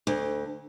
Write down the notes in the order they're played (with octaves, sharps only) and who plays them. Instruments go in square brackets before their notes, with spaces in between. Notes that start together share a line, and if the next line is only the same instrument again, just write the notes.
[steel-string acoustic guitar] D2